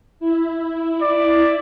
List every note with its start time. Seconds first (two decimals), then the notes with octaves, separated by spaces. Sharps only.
0.20 E4
1.02 D5